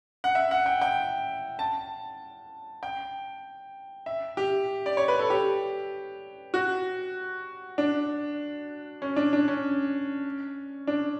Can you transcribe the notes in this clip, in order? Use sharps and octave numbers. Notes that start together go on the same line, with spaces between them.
F#5
E5
F#5
G5
G5
A5
G5
E5
G4
D5
C#5
B4
A4
G4
F#4
D4
C#4
D4
D4
C#4
D4